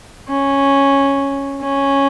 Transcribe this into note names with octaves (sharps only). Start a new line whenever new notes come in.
C#4
C#4